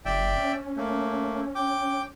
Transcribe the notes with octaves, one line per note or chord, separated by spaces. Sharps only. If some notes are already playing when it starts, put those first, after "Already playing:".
F#1 D5 E5 G5
C#4
A3 A#3
G5 D6